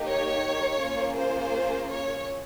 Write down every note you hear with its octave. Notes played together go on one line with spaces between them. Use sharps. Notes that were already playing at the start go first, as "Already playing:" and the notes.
Already playing: A#3 D#4 G4
C#5
A#3 C#4 F4 G#4
C5
C#5